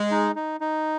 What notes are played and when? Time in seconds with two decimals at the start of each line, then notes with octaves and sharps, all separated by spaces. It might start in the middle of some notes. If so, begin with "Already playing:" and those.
Already playing: G#3
0.11 D#4
0.36 D#4
0.60 D#4